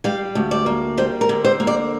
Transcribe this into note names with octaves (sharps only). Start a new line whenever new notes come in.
G3 F5
D2
D5
A#3
G3 C5
A#4
D3
C5
A#3
D5